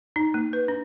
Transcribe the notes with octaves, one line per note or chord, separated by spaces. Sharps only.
D#4
A#3
B4
D4